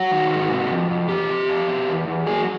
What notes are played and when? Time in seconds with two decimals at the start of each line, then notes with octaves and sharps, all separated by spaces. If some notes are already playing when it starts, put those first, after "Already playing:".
Already playing: F#3 F#4
0.12 D#3
0.31 G#2
0.51 C3
0.70 F2
0.90 F2
1.09 E3 G4
1.30 C3
1.49 F2
1.68 B2
1.87 E2
2.07 E2
2.27 F#3 G#4